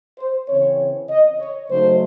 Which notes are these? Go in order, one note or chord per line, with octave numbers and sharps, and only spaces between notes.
C5
C#3 E3 C4 C#5
D#5
C#5
C#3 F#3 A3 D#4 C5